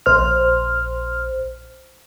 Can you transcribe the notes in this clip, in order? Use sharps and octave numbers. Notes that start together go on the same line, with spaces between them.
A#1 C5 F6